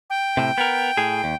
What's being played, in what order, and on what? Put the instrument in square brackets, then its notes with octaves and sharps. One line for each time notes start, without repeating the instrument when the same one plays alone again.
[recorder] G5
[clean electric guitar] A2 C3
B3 A#4
A2 G#4
D#2